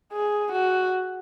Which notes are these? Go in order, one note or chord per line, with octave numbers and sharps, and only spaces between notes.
G#4
F#4